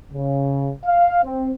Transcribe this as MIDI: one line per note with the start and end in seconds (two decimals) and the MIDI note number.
0.13 0.70 49
0.85 1.22 77
1.24 1.51 60